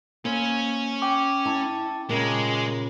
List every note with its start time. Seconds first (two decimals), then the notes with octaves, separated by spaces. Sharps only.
0.25 A#3 C#4 C5
1.02 G5 D6
1.46 E4 A5
2.10 A#2 C#3 G#3 A#4